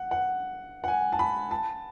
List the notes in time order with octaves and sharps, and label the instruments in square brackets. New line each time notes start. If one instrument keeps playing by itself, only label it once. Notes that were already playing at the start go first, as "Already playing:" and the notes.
Already playing: [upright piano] F#5
F#5
F#5
G#5
A5
B5
A5